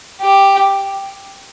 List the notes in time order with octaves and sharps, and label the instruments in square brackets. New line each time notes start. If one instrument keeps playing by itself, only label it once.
[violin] G4